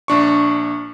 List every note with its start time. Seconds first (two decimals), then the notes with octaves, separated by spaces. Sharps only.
0.08 A#1 D4 C#6